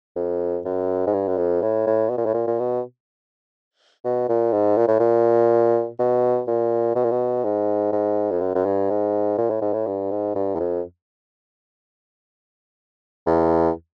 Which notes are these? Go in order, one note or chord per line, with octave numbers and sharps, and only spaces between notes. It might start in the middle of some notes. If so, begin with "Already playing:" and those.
F2
F#2
G#2
G2
F#2
F2
A2
A2
B2
A#2
A2
A#2
A#2
B2
B2
A#2
G#2
A#2
A2
A#2
B2
A#2
B2
A#2
B2
G#2
G#2
F2
F#2
F#2
G2
G#2
A#2
A2
G#2
A2
G2
G#2
G2
E2
F2
E2